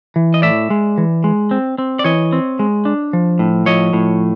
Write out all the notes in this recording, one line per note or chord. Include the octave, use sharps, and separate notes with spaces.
E3
D#5
A2 D5 E5
G#3
E3
G#3
C4
C4
D5
E3 C#5 D#5
C4
G#3
D4
F3
A2
F3 C#5 D#5
A2